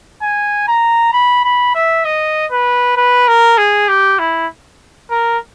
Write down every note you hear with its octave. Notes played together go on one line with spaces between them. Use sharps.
G#5
A#5
B5
B5
E5
D#5
B4
B4
A#4
G#4
G4
E4
A#4